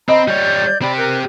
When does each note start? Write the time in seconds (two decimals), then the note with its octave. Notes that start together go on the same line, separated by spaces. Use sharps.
0.09 C4 D#5 A#5 B5
0.28 G3 C#5 D5 G6
0.82 C4 G4 D5 B5
0.97 A#4 F#6